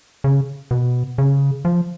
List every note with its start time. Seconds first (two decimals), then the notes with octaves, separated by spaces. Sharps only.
0.24 C#3
0.71 B2
1.18 C#3
1.65 F3